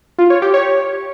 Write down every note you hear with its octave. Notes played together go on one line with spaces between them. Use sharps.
F4
C#5
G4
C#5